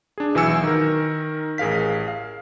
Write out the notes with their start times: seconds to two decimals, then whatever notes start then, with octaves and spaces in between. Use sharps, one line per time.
0.18 D4 G#4
0.35 B1 E3 F#4 G#5 E6 C#7
0.63 D#3 A#4
1.58 A1 G#4 A#4 F5 B6
2.08 F5